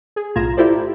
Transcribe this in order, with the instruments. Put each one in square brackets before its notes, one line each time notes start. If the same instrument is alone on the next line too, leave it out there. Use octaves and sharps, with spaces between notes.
[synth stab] G#4
B1 A2 F4 A#5 G#6 E7
E4 F4 G4 A4 C5 D5